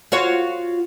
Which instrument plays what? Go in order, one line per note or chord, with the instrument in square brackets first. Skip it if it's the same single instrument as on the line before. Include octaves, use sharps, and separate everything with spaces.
[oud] F4 F#4 C#5